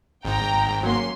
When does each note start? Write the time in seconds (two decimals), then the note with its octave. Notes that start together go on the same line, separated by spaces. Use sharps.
0.25 G#1 G#2 G5 A#5
0.83 F#3 A#3 C#4 C6